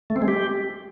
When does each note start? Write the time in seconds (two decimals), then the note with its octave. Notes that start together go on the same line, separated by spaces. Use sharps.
0.10 A3
0.16 C4
0.22 G#3
0.28 G4